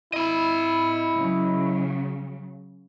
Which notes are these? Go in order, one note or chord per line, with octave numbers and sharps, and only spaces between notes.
E4 D#5 B5
C#3 F#3